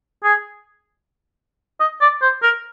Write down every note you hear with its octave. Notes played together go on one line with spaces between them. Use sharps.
G#4
D#5
D5
C5
A#4